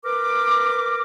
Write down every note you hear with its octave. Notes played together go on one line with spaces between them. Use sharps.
A#4 B4 D6